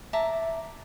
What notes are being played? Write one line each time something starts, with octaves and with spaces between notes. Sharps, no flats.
D5 E5 A5 A#5